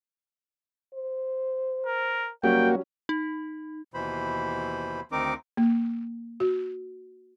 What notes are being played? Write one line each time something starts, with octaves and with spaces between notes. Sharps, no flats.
C5
A#4
F#3 G3 A#3 C#4 F#4 G5
D#4
D#2 B2 E3 C5 B5
D2 D#3 C4 D#4 A#4 D6
A#3
F#4